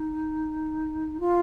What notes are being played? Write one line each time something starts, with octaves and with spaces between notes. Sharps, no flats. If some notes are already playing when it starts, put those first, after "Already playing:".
Already playing: D#4
F4